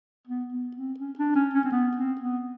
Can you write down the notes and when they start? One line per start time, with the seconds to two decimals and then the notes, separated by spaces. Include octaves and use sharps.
0.28 B3
0.52 B3
0.76 C4
1.00 C#4
1.18 D4
1.36 C#4
1.54 C#4
1.65 C4
1.72 B3
1.97 C4
2.21 B3